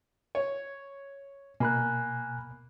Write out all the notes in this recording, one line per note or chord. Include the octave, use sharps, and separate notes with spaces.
C#5
B2 A#3 G#5 B5 F#6